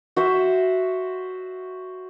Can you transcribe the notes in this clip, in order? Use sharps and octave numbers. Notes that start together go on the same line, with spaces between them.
F#4 C5 E5